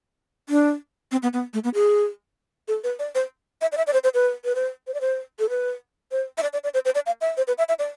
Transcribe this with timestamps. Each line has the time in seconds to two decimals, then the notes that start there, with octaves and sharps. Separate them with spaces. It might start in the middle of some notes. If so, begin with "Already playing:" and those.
0.49 D4
1.12 C4
1.23 B3
1.33 B3
1.54 A3
1.64 B3
1.74 G#4
2.68 A4
2.84 B4
2.99 D5
3.15 C5
3.62 E5
3.72 D5
3.77 E5
3.87 D5
3.93 C5
4.04 C5
4.14 B4
4.45 B4
4.55 C5
4.87 C5
4.94 D5
5.01 C5
5.39 A4
5.50 B4
6.12 C5
6.38 E5
6.43 D5
6.53 D5
6.64 D5
6.74 C5
6.85 C5
6.95 D5
7.06 F5
7.21 E5
7.37 C5
7.48 B4
7.58 E5
7.69 E5
7.79 D5